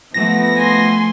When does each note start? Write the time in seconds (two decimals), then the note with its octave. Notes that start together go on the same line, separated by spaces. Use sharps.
0.14 F3 A3 B3 A#6
0.58 G#5 C6